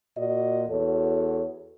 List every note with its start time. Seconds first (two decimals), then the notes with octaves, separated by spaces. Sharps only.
0.17 A#2 F#4 D5 D#5
0.70 E2 F#4 A4 C#5